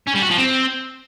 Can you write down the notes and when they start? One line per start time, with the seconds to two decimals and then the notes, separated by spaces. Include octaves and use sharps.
0.07 C#4
0.14 G3
0.22 F#4
0.30 F3
0.38 C4